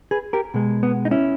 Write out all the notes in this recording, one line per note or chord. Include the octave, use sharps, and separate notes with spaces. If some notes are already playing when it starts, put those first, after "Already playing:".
G#4 B4
G4 A#4
B2 G#3
B3
D#4
C#4 E4